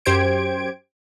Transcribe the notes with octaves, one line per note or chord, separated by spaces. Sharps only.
F#2 G4 C5 G#6 D7